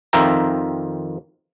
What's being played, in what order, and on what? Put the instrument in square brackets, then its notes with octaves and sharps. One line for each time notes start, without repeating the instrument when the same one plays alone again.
[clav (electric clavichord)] F2 D#3 F4 E5 G5 A#5